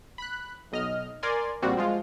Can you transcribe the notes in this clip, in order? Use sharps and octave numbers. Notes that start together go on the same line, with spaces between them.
B5 F#6
B1 D#5 F6
A#4 D5 G#5 C6
A#1 G3 A#3 C4 F#4
F3 G#3 F4